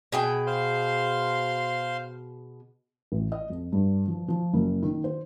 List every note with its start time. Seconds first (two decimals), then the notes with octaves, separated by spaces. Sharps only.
0.12 B2 G#4 G5
0.47 C5 F5 C6
3.12 A1
3.32 D#5
3.50 F2
3.72 G2
4.08 F3
4.28 F3
4.54 F#1
4.83 D#3
5.04 C5